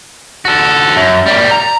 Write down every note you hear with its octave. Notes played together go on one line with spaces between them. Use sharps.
F#4 A4
F#2
G3 A#3
A#5